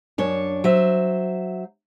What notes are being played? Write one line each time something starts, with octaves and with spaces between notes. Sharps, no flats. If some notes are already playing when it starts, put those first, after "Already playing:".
F#2 D4 C#5
F#3 C5 E5